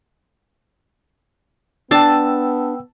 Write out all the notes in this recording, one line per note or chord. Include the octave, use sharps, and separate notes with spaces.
B3 D4 G5 A5 E6